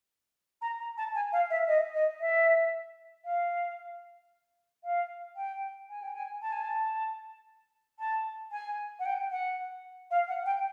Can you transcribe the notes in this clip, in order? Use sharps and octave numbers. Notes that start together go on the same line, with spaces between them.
A#5
A#5
A5
G#5
F5
E5
D#5
D#5
E5
F5
F5
G5
G#5
G5
G#5
A5
G#5
A5
A5
G#5
F#5
G5
F#5
F5
F#5
G5